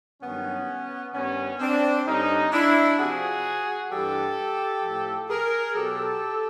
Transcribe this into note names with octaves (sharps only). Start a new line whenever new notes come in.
G2 D#3 F#3 B3 C#4
G2 D#3 G3 B3 C#4
C4 D4
G2 D3 G3 C#4 D#4
D4 E4
C3 F3 F#4 G#4
G2 E3 G3 G4 A4
A2 F3
G#4 A#4
B2 F#3 G4 A4